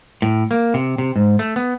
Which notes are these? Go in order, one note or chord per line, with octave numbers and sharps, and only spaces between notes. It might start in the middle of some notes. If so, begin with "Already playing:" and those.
A2
A#3
C3
C3
G#2
A3
B3